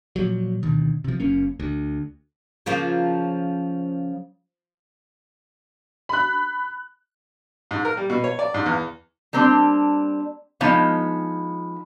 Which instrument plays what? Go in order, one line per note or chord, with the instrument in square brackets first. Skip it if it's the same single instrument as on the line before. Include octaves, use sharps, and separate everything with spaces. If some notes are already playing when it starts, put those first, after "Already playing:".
[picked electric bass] A#2 F3 F#3
D2 B2 D#3
C3 F3
F#1 F#2 A#3 C#4
D2
[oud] C#3 F3 A#3
[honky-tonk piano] B5 F#6
[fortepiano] G#2
A#4
G3
B2
C#5
D5
G#2
E2
[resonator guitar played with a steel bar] G3 A#3 C4 D4
F3 G#3 B3 D#4 C#5 F5